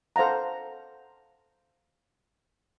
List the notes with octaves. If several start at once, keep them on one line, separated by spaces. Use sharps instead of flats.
A4 C5 F5 F#5 A#5